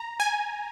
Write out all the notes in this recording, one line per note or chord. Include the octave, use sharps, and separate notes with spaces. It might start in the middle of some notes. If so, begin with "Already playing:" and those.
Already playing: A#5
G#5